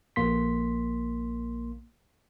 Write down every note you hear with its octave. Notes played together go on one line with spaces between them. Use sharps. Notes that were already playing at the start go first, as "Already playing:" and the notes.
A#1 A#3 C6 B6